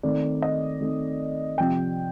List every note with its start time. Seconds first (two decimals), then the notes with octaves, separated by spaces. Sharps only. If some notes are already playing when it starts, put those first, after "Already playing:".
0.03 D#3 A3 C4 D5
0.42 D#5
0.81 D#3 A3 C4
1.58 C3 F3 C4 G5